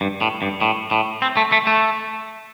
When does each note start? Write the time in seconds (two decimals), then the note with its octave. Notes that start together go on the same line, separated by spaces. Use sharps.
0.01 G2
0.21 A2
0.42 G2
0.61 A2
0.91 A2
1.22 C4
1.37 A3
1.52 A3
1.67 A3